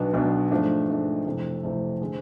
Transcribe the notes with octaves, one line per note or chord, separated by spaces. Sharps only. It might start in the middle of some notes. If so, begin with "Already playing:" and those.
Already playing: B1 B2 B3 D4
B1 B2 B3 D4
G#2 F3 A3 D4
G#2 F3 A3 D4
F2 C3 E3 A3
F2 C3 E3 A3
D3 G#3 C4